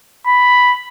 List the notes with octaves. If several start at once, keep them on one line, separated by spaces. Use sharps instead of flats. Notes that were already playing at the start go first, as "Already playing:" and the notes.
B5